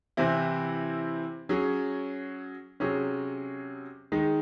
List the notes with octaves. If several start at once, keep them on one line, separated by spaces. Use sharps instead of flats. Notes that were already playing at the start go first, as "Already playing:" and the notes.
C3 E3 C4 E4
F#3 C#4 G#4
C3 F#3 C#4 G#4
D#3 G#3 D#4